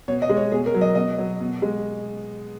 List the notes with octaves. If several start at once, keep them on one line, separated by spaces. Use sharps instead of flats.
B2 C#5
D#5
G#3
C#5
B2 G#4
A#4
F#3
D#5
B2 D#5
F#3
B2
G#3